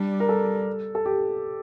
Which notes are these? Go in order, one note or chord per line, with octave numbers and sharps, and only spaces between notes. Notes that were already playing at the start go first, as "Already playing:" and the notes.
Already playing: G3 D4
A#4
A4
A4
G4